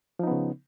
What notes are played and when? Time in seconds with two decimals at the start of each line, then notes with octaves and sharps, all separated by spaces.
0.19 F3
0.23 D#4
0.27 B3
0.31 C#3